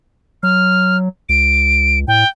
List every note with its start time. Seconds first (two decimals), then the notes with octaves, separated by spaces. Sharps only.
0.43 F#3 F6
1.29 C#2 D7
2.08 A2 G5